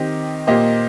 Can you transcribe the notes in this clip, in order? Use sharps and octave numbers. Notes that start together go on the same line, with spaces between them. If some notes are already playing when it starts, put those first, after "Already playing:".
Already playing: D#3 C4 G4 D#5
A#2 A#3 G4 C5 D#5